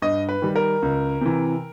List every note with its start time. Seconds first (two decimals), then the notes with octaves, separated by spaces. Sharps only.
0.02 G2 D#5
0.29 B4
0.42 D#3 G3
0.56 A#4
0.82 C#2
1.21 C3 E3